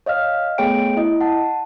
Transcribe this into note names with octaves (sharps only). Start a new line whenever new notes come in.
C#5 D#5 F5 F6
A3 B3 G#4 C#5 G5 D7
E4 D#5
F#5 A5